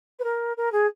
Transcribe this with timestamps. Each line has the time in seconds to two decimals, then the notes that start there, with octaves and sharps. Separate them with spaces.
0.19 B4
0.23 A#4
0.57 A#4
0.72 G#4